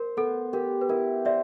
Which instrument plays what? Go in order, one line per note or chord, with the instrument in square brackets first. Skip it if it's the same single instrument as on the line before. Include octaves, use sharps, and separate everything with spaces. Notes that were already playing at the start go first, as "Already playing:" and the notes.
Already playing: [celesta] A#4 [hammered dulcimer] C5
[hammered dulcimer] B3 [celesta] A4
[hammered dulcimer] G4 [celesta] A#4
[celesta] B4
[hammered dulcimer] E4 [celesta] A#4
[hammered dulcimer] C5 [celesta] D5 E5